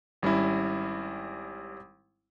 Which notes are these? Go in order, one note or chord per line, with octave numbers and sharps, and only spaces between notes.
G#1 G3 C#4 E4